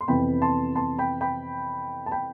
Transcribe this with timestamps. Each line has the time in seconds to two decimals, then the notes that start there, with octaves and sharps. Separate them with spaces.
0.01 C6
0.08 F2 C3 E3 B3 G5 B5
0.42 A5 C6
0.75 A5 C6
0.98 G5 B5
1.21 G5 B5
2.06 A5
2.11 G5 B5